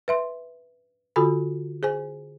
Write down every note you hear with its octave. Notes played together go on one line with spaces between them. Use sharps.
B4 E5 C6
D3 F4 F#4 A4 G#5 B5
G#4 C5 G#5